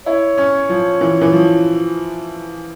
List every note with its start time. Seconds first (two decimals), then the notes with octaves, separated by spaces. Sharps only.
0.06 E4 C#5
0.38 C#4
0.69 F3
1.01 E3
1.21 E3
1.33 F3